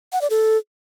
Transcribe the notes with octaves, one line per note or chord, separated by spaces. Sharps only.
F#5
D5
A4